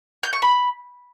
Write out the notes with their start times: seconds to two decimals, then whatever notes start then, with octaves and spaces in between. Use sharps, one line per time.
0.23 G6
0.33 C#6
0.42 B5